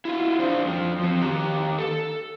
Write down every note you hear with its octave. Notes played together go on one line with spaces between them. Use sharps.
E4 F4
D4 F4 C5
F2 F3
F3 C4
D#3 G4 A#5
A4